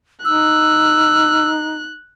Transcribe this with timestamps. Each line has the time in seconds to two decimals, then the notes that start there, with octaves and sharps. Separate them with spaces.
0.25 D#4 E6 F#6